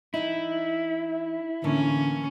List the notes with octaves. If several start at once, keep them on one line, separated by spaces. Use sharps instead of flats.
E3 D#4 E4
A2 D3 E3 A#3 C#4